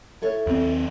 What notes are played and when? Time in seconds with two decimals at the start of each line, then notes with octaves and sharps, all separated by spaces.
0.22 E4 A4 C#5
0.47 D#2 C4